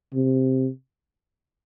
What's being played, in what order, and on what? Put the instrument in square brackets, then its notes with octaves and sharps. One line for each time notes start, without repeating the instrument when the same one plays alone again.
[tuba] C3